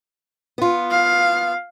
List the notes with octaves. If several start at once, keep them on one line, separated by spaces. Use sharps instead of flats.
B3 F4
F5